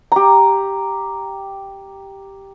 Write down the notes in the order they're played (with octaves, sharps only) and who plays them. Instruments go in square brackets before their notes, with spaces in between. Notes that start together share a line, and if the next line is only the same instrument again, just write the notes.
[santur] G4 A#5